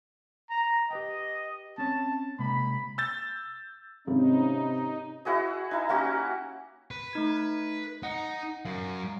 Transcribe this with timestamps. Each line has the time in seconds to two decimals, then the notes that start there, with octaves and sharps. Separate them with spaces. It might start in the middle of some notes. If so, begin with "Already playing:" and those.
0.50 A#5
0.91 G4 B4 D#5 G5
1.78 C4 C#4 C#5 A5
2.39 C3 G#3 A#3 B5
2.98 E6 G6 A6
4.07 G#1 C3 C#4 D#4
5.25 E4 F#4 G#4 D#5
5.71 D#4 E4 A#5
5.89 A#3 C#4 F#4 G4
6.91 B4
7.13 A3 D#4 G#6
8.03 D#4 F#5
8.65 F#2 F5